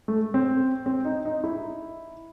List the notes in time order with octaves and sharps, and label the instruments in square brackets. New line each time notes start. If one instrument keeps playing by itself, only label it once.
[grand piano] A3
C4
C4
D#4
D#4
E4